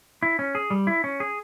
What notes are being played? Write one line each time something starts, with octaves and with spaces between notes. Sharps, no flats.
E4
C#4
G#4
G3
E4
C#4
G#4